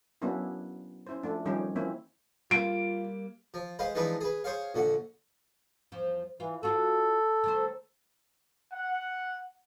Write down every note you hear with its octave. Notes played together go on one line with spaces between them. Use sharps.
F#3 A#3 B3 C#4 D4 E4
C#4 E4 C5
F3 A3 D4
D#3 F3 G3 C#4 D#4 G4
E3 F3 A#3 C4 C#4 E4
G3 A#3 F4 D7
F3
G#3 B4 C5 F5
E3 F3 G#3 D4 D#4 B4
G#4 B4
G#4 C5 C#5 F5
A#1 D3 F#5
E2 F3
E3 F4
D4 F4 F#4 A4
D#3 A3 C5
F#5